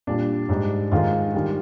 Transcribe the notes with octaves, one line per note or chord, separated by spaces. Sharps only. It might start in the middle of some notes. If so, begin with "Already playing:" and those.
A#2 G3 D4
G#2 G3
G#2 D#3 G#3 F4
D#3 G3